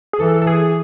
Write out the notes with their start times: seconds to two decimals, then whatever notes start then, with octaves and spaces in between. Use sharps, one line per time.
0.13 G#4
0.19 E3 A4
0.42 A4
0.47 G#4